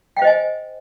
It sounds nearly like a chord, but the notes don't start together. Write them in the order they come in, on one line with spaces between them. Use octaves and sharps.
G5 F5 C5 D#5 G#5